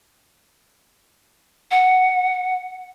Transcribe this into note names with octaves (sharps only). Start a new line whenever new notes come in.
F#5